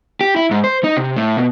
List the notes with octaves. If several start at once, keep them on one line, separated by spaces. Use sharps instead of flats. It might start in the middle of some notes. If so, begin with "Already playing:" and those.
G4
E4
G#2
C5
D#4
C3
A2
B2